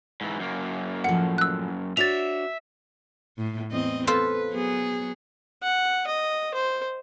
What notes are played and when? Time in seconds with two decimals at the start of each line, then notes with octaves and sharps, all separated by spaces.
0.21 G#2 E3
0.40 F#2 A#3
1.04 A2 F3 F#5
1.38 E6 F#6
1.97 D4 F#4 C#5 E5 A6 F7
3.38 A2
3.71 E2 C4 D#5
4.07 F4 A4 B4 C5
4.50 F#3 B3 G#4
5.62 F#5
6.07 D#5
6.54 C5